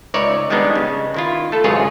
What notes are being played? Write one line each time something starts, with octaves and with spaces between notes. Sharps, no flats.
C#2 D#4 C#5 D5 E5
D#3 G3 G#3 B3 D4 D#4
C#3
D#3 E4 F4
A3 A4
G#1 C#2 F#2 F4 G#4 C#5